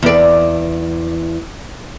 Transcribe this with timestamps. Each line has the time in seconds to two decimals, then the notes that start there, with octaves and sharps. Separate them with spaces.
0.03 E2 D5